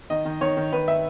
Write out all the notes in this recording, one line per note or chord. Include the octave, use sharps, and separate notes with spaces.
D#3 D#5
D#3
D#3 C#5
D#3
D#3 B4
E5